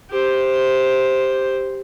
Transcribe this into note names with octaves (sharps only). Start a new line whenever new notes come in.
G4 C5